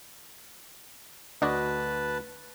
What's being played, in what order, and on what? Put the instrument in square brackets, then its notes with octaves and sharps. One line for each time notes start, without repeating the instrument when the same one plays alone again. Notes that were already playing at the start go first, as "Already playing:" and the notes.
[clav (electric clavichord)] D2 F#4 D#5 [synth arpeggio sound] D4 [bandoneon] B4 A5